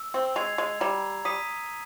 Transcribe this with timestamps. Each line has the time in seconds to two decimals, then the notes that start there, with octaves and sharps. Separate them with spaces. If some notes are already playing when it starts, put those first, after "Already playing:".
Already playing: E6
0.14 C4
0.36 G#3 G#6 C7 F7
0.58 G#3
0.81 G3 A#5
1.25 G3 D#6 B6 D#7